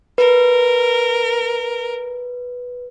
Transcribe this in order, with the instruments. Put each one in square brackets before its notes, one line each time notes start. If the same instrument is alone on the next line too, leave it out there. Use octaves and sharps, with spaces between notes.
[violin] A#4 [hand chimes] B4